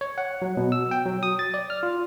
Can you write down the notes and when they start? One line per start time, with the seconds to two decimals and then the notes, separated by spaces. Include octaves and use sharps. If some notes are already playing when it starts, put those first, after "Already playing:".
0.01 C#5
0.18 F#5
0.42 F#3
0.57 B2
0.72 E6
0.91 G5
1.06 F#3
1.23 D#6
1.39 A6
1.54 D5
1.70 F6
1.83 F4